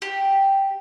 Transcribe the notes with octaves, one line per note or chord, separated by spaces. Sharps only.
G4